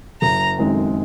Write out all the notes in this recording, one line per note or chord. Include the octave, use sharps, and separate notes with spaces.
F#1 A#5
F#2 D#3 G#3 C4